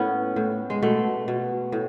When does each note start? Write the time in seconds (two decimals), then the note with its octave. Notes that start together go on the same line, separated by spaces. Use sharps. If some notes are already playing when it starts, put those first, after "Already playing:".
Already playing: A2 B3 C#4
0.36 A2
0.70 G#3
0.82 B2 A3
1.28 B2
1.72 A2